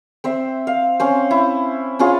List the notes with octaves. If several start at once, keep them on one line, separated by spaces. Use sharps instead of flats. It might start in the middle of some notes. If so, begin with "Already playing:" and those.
C4 C5 E5
F5
C4 C#4 C5
E4
C#4 E4 F4 G#4